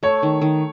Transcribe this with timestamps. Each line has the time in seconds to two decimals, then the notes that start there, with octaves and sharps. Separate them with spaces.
0.03 A3 C#5
0.23 D#3
0.41 D#3